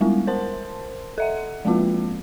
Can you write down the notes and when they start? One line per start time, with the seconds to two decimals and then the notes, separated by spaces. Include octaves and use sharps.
0.01 G3 G#3 B3 E4
0.27 A#4 C5 A5 C6
1.18 A4 E5 F#5
1.65 F3 G#3 A#3 C4 F4